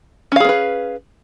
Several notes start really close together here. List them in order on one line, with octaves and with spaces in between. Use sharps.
C#4 F5 G#4 B3 B4